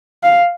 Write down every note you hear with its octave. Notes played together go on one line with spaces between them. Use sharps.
F5